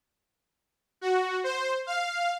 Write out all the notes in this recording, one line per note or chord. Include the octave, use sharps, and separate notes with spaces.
F#4
C5
F5